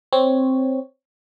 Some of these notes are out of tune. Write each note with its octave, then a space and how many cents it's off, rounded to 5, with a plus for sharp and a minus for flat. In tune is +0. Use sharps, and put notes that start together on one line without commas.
C4 +0 C#5 +0